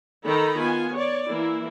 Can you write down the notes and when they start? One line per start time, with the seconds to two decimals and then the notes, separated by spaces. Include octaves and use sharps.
0.25 D#3 D#4 A4 A#5 B5
0.60 B3 F4 G#5
0.94 C#5 D5
1.29 E3 A#3 E4